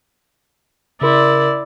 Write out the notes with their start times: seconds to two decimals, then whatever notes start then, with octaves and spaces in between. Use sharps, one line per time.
1.01 C#3 E4 A#4 D5 C6